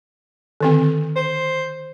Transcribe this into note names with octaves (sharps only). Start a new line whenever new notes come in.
D3 D#3 C4
C5